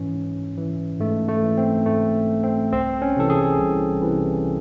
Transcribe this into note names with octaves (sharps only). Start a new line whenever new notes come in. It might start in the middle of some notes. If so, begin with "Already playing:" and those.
Already playing: G#2 E3 C#4
G#2
E3
G#2 A3
A3
E3
C4
G#2 A3
E3
C4
C2 C4
C#4
C3 E3 A4
G#4
C2
C3 E3